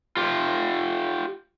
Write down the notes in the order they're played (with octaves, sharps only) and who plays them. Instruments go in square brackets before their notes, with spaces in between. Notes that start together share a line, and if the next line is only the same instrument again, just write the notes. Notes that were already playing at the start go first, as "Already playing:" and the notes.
[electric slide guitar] F4 G4